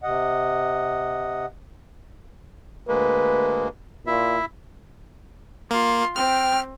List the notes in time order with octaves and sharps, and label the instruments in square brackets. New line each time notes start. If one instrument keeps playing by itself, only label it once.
[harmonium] C3 D#5 F#5
[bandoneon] D2 G#3 A#3 [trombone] B4
[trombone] A#2 [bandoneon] E4 E5
[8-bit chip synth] A#3 [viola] F4 C6
[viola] C4 [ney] G5 [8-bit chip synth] F6